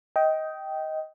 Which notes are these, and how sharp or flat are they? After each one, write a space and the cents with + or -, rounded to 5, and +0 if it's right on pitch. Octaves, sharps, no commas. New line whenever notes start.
D#5 +15 G5 -10